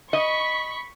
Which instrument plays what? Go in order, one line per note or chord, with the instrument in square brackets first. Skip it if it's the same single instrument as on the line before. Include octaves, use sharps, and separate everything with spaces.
[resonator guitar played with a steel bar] D#5 [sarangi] B5 [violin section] C#6 B6